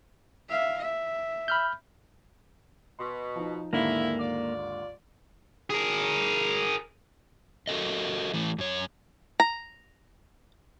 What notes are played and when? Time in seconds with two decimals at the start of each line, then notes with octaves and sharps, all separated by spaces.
0.49 E5 F5
0.79 E5
1.48 B5 F6 G6
2.99 B2 C6
3.36 F3 D#4
3.73 D#2 G#2 D3 E3 A#3 E4
4.20 F4 D5
5.70 G#4 A#4
7.67 F#4 A4 A#4 D#5
8.34 E3 A3
8.58 F#2 C#5
9.40 A#5